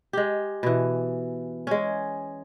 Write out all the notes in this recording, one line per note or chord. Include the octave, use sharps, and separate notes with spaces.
G#3 G4
B2 E3
G#3 C#4